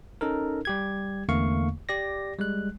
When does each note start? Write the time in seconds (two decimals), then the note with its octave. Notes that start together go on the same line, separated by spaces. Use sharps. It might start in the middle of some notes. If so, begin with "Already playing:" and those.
0.21 C#4 D#4 A4 A#4
0.65 G3 G4 G#6
1.29 E2 D3 A3 A#3 F5 C#6
1.89 G4 D5 A#6
2.38 G3 G#3 F#6